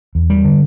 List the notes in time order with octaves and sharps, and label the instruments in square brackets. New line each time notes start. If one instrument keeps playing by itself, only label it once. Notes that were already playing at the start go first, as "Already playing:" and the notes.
[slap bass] E2
G3
D3